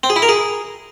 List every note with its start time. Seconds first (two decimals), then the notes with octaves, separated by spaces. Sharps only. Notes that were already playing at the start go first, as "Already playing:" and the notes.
0.03 C4
0.10 G#4
0.16 E4
0.22 A#4
0.29 G#4